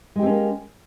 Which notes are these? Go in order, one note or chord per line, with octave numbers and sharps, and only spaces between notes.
G#3 A#3 C4 C#4 G4